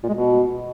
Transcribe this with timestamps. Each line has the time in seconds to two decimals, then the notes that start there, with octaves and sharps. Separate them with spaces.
0.03 A#2
0.08 G#3
0.14 B2